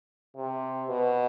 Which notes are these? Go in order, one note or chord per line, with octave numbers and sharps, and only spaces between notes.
C3
B2